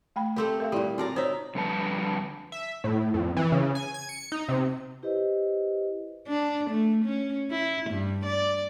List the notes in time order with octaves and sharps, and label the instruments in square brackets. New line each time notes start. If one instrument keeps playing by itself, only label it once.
[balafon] A3 G5 B5
[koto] A3 C4 G4 [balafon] A#4
[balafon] A#4 E5 F5
[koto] A#2 G3 [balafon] E4 G4
[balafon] C4 F#4 A5 [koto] F4 D5 A#5
[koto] D#4 E5 [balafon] C5 C#5
[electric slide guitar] F2 D3 G3 B4 A5
[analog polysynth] E5
A2
F2
E3
C#3
G#5
G#6
C#7
D#4
C3
[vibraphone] E4 G4 B4 C5 D#5
[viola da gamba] D4
A3
C#4
E4
G2
D5